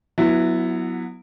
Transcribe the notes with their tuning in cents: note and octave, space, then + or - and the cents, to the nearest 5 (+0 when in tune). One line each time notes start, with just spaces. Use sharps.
F#3 -20 B3 +0 E4 +0